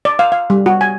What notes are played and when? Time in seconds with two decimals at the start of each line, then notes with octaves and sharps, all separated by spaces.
0.05 D5
0.19 F5
0.32 F5
0.50 G3
0.66 F#4
0.81 G#5